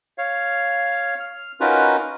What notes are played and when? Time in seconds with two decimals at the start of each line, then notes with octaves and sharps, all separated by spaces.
0.18 C#5 F5
1.20 F6
1.60 C#4 D#4 F4 F#4 A#4 B4